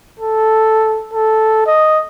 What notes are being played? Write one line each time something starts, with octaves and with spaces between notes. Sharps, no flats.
A4
A4
D#5